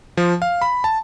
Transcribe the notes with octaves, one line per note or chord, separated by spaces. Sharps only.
F3
F5
B5
A5